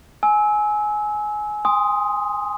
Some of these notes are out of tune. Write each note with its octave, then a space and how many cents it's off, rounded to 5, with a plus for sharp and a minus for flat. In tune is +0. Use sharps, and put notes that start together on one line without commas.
G#5 +15 E6 -25
G#5 -35 C6 +0 D#6 +5